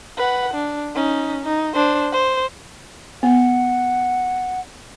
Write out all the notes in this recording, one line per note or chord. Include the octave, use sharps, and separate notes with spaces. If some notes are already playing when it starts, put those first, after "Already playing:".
B4 F#5
D4
C#4 D#4
D#4
D4 C5
C5
B3 F#5